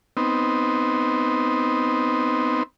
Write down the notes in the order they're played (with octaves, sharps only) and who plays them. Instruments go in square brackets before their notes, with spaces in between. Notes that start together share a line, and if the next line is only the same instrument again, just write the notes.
[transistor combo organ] B3 C4 D#4